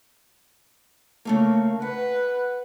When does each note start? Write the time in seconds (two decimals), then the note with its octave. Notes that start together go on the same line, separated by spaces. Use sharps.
1.25 C#3 A3 A#3
1.82 B4 F#5